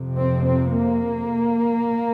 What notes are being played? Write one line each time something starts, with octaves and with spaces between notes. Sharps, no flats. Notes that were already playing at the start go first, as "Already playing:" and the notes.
Already playing: F2 C3
C4
C4
A#3